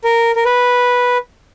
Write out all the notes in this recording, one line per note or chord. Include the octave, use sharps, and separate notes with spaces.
A#4
A#4
B4